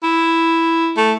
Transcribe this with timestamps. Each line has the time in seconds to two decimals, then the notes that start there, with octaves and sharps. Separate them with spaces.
0.03 E4
0.97 A3